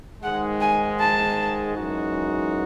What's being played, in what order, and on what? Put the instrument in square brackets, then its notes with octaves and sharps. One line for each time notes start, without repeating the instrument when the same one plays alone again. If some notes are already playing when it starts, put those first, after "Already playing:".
[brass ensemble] G#2 D#3 G#3 [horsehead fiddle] F#5
[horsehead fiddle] G#5
A5
[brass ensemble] F#2 E3 G#3 D#4 F#4